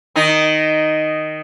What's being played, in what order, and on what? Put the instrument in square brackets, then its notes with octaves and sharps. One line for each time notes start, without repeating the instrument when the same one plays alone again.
[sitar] D#3 D#4